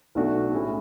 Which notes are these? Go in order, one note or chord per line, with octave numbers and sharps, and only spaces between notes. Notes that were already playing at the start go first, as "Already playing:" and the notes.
B1 B2 A3 D4 F#4
A2 G#3 C#4 E4 G#4